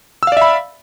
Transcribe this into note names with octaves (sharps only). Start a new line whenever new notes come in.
D5 E5 F5 B5 E6